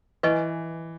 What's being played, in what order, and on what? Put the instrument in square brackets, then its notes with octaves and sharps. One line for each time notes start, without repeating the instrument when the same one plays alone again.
[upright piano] E3 [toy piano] B4 D#5 G#5 C#6